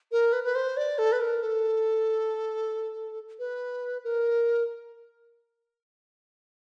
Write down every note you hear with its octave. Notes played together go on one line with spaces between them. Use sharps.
A#4
B4
B4
C5
D5
A4
B4
A#4
A4
B4
A#4